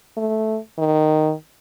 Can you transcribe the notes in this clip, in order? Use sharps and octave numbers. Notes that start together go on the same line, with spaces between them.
A3
D#3